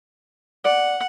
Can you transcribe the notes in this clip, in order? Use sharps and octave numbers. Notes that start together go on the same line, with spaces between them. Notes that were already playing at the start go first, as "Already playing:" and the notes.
D5 F#5